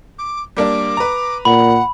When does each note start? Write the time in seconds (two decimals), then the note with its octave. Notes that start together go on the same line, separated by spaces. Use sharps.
0.18 D6
0.57 G3 A#3 D4 D6
0.97 B4 A#5
1.45 A#2 F#5 B5